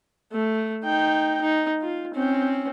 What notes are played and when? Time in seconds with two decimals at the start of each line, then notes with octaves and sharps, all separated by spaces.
0.32 A3
0.84 D#4 G5
1.41 D#4
1.81 F4
2.14 C4 C#4